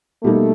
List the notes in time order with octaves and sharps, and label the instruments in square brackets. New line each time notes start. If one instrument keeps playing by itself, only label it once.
[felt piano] B2 G3 A#3 D#4 [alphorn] A3